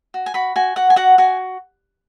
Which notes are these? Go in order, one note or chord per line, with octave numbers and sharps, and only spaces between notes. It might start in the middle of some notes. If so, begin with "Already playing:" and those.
F#4
G#5
F#4 B5
F#4 G#5
F#4 F#5
G#5
F#4 F#5
F#4 G#5